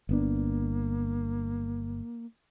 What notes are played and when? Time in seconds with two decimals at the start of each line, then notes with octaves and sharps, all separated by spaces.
0.09 G1 A#3 B3 D4